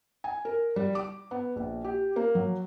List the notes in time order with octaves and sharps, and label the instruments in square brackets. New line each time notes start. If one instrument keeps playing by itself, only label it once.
[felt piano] G#5
A#4
G3
D6
B3
A#1
G4
A#3
F#3